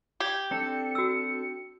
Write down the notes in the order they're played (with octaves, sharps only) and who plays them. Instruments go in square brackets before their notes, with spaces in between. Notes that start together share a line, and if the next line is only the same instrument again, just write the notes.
[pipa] G4 [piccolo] G#6
[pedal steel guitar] C4 D4 A4 [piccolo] C#7
[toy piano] F#4 E6 [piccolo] C#7